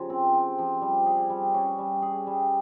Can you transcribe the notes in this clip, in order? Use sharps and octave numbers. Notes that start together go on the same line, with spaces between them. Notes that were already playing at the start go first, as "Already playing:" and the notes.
Already playing: C#3 F3 G4
C4
G4
F3
G3
G#4
G3
C#4
G3
G#4
G3